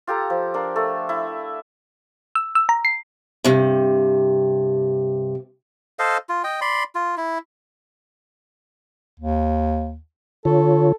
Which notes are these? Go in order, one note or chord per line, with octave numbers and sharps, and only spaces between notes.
F4 G4 A4 A#5
F3
D4 F4 A#4
A3 A4
E4
E6
E6
A#5
C7
G2 C3
A4 C5 D#5 F5
F4
D#5 G5
D5 B5 C6
F4
E4
D#2
D3 F4 A4 C#5